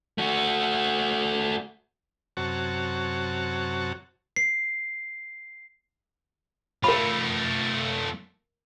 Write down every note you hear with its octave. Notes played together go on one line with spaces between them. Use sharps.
A3 F#4
F#2 C3 F#4 C#5 A5
C7
A3 F4 A#4 B5